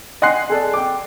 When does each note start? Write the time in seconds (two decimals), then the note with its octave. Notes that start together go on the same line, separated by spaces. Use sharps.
0.22 D#5 F#5 G#5 C6 F#6 C7
0.50 G#4 A4 D5
0.74 G5 D6